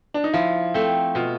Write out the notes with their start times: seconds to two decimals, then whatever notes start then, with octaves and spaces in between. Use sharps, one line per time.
0.14 D4
0.24 D#4
0.33 F3 E4
0.74 A3 C4
1.15 B2 F4